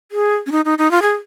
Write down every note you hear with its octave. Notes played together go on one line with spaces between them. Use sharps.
G#4
C#4
D#4
D#4
D#4
F4
G#4